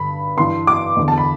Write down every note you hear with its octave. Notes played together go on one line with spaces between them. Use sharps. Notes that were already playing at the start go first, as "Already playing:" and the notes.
Already playing: G2 D3 B5
G2 E3 C6
D6
E2 D3
A5
B5